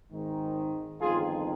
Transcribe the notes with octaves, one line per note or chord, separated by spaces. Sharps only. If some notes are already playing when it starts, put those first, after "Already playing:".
G#1 G#2 D#3
G1 F2 D#3 F4 G#4